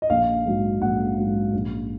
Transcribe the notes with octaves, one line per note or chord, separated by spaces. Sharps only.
D#5
A#1 F5
G#2 F#3
A#1 F#5
G#2 F#3
A#1